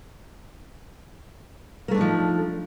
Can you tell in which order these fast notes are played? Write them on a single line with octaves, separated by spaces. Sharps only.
A#3 A3 D4 D#4 F3